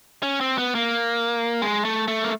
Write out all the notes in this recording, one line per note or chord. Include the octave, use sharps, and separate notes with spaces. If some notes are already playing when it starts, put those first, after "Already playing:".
C#4
C4
B3
A#3
G#3
A3
A3
A#3